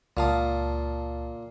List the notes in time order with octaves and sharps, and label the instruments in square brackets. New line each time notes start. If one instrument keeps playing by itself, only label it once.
[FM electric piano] C#2 A5 [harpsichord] A#2 F5 D#6